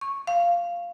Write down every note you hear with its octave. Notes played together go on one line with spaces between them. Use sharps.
C#6
F5